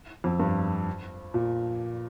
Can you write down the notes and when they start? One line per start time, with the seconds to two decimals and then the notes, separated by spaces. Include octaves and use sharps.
0.24 F2
0.39 G2
1.34 A#2